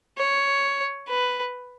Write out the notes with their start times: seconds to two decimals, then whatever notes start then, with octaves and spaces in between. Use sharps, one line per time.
0.18 C#5
1.09 B4